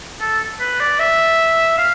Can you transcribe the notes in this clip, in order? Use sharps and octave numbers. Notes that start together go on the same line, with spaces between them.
A4
B4
D5
E5
F5